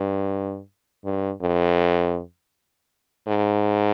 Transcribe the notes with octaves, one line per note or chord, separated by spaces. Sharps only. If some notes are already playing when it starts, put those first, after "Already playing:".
Already playing: G2
G2
F2
G#2